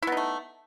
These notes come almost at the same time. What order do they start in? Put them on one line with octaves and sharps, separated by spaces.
E4 B3 D#4 A3